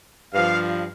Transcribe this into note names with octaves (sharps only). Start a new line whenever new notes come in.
G2 F3 F5